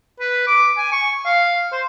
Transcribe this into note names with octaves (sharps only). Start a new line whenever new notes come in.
B4
D6
G#5
C#6
F5
C5